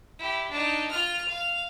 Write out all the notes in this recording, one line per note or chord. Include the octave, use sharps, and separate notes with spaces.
E4 G4
D4 D#4
F4 F6
F5